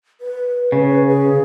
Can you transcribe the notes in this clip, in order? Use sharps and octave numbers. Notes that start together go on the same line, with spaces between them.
B4
C#3
G#4